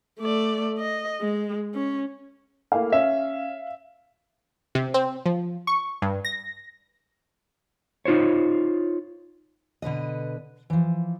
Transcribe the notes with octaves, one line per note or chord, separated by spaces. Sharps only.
A3 D5
D#5
G#3
C#4
A3 A#3 E4 F5
C#4 E5
C3
C4
F3
C#6
G2
A#6
D#4 F4 C5 C#5
B2 D3 B4 D#5
E3 F3